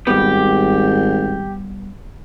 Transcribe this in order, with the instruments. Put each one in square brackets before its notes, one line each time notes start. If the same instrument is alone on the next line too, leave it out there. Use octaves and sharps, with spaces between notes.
[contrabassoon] G#1 [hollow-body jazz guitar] G3 B3 [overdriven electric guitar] G4